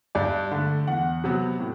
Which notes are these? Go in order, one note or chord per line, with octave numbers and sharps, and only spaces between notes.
G2 D5
D3 A3
E2 F#5
C3 F#3 B3
A2